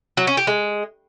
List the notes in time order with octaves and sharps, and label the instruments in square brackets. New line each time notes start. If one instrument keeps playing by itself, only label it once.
[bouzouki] F#3
C#4
G4
G#3